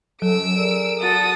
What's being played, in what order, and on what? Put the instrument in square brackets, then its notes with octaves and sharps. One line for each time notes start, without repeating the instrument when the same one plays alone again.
[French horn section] F#2 A4 [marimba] F#3 [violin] E6 D7
[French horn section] G#4 A#4 D5
[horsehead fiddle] F#4 A5 [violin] A4 D#6